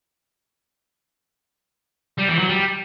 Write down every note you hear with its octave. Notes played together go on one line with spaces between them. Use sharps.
G3
E3
F#3
G3